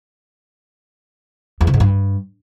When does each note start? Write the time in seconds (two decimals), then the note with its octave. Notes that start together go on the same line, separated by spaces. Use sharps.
1.61 E2
1.67 C3
1.74 G#2
1.80 G2